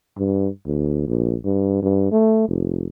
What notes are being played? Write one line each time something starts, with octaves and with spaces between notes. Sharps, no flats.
G2
D2
A#1
G2
G2
A3
F1